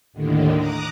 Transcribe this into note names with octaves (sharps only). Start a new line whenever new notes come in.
D#2 A2 D3 D#3
A#5 D6 D#6 F#6